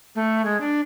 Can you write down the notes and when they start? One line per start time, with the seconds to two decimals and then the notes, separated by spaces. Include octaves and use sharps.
0.15 A3
0.45 G#3
0.61 D4